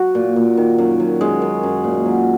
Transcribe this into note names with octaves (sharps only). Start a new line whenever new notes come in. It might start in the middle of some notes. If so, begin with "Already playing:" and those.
Already playing: F#3 F#4
A#2
A#2
D#3
F#2
F#2
F#2 G#3
F#2
F#2
A#2
F#3